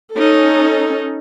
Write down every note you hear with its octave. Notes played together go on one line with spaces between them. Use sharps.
C#4 D#4 A4